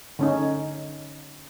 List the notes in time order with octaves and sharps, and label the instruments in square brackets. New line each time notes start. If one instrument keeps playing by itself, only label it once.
[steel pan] D3 C#4 D#4